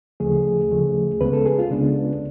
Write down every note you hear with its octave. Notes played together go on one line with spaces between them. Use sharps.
D2 C#3 F3 A3 G#4
D2 C#3 F3 A3
C#2 C#3 G#3 B3 B4
A4
G#4
F4
C#2 C#3 G#3 B3 D4